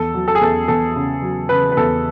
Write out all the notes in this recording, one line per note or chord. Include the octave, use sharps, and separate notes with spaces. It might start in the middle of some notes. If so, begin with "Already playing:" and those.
Already playing: E2 A4
F#3
A4
G#4
E2 A4
E2 A4
C#3
F#3
C#3 B4
B4
E2 A4